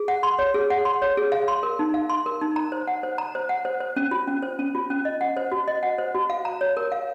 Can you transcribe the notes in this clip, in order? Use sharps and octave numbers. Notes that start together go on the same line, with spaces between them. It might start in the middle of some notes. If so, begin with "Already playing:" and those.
Already playing: G#4
F#5
C6
C#5
G#4
F#5
C6
C#5
G#4
F5
C6
A#4
D#4
F5
C6
A#4
D#4
A#5
C5
F#5
C5
A#5
C5
F#5
C5
C5
C#4
F4
C#4
C5
C#4
F4
C#4
D#5
F#5
C5
F#4
D#5
F#5
C5
F#4
F5
A#5
C#5
A#4
F5